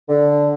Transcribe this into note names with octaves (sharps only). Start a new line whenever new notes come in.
D3